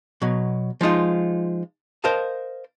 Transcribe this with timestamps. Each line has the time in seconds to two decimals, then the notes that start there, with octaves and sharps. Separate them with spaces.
0.22 B2 F#3
0.81 F3 G#3 D#4 F4
2.04 A#4 C5 D#5 F5 A5